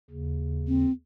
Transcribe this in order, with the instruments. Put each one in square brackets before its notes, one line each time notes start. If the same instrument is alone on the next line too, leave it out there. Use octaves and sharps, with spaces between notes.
[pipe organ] D#2 C#3
[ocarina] C4